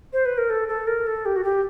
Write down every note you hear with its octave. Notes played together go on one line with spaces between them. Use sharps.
C5
B4
A#4
A4
A4
A#4
A4
G4
F#4
G4